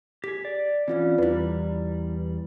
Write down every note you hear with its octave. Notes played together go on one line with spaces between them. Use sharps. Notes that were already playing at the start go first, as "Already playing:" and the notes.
G4 G#4 B6
D5
E3 C4 C#4 F4 D5
E2 G3 E4 B4